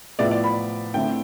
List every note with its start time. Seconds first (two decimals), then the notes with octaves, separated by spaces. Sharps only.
0.19 A2 F3 B3 E4 D5
0.31 D5
0.44 B5
0.94 D3 A3 C4 E4 G5